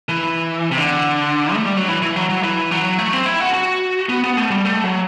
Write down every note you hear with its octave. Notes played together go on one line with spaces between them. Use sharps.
E3
C3
D3
A3
G3
F#3
E3
E3
F#3
F#3
E3
F#3
A3
C4
E4
F#4
F#4
B3
B3
A3
G3
A3
F#3